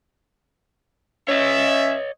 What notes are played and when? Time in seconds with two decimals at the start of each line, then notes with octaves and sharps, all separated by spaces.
1.28 C#4 C#5 D#5 E5